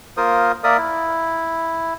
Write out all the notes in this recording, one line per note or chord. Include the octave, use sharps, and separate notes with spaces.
A#3 F4 A#4 C5 D#6
A#3 A#4 D5 E5 D#6
E4